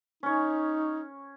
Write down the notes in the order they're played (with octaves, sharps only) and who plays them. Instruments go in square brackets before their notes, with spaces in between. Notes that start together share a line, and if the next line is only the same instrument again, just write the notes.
[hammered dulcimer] C#4 C#5 [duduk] D#4